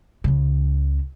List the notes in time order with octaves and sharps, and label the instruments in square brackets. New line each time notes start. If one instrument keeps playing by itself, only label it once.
[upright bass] C#2 C#3